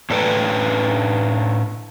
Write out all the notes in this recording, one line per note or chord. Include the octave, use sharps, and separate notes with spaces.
A2 A3 D4 A4 B4 G5